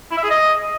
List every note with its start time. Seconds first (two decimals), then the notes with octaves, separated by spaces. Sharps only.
0.11 E4
0.17 E5
0.24 G#4
0.30 D#5